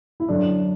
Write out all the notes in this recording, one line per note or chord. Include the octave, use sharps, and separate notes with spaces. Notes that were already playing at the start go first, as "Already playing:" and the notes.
E4
F#2 D3 D4